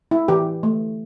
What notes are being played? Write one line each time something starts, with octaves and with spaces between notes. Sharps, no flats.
E4
E3 G4
A3